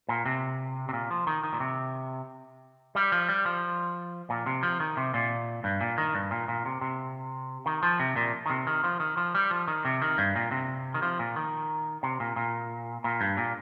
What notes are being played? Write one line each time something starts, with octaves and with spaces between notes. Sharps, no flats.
A#2
C3
C3
A#2
F3
D#3
D#3
A#2
C3
G3
F3
G3
F3
A#2
C3
F3
D#3
C3
A#2
G2
A#2
D#3
G2
A#2
A#2
C3
C3
D#3
F3
C3
A#2
D#3
C3
D#3
F3
D#3
F3
G3
F3
D#3
C3
D#3
G2
A#2
C3
D#3
F3
A#2
D#3
C3
A#2
A#2
A#2
G2
A#2